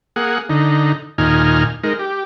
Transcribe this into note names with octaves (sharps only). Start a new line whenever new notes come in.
A#3 G#4 F#5
D3 D#4
D#2 A#2 D#4 G#5 F6
G#3 D#4 A#4
G4